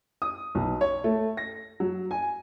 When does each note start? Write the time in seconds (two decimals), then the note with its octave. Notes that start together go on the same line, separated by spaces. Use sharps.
0.22 D#6
0.55 B1
0.81 C#5
1.04 A3
1.37 A#6
1.80 F#3
2.11 G#5